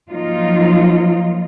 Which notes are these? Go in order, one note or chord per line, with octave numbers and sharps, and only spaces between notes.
F3 F#3 A#3 D#4 F4